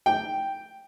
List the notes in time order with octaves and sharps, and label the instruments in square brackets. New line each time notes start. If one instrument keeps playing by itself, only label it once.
[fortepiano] G5